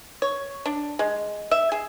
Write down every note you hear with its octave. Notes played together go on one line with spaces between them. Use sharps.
C#5
D4
G#3
E5
G#4